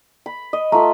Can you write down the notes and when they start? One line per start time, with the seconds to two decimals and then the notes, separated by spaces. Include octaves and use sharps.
0.26 B5
0.53 D#5
0.72 A3 F4 A#5 B5